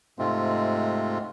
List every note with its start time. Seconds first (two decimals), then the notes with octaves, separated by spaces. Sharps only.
0.19 G#2 C3 G#3 A3 C4 F4